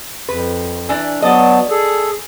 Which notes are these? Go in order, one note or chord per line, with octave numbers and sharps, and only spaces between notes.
F2 B4
E3 D4
F#3 B3 D5 D#5 A5
G#4 A4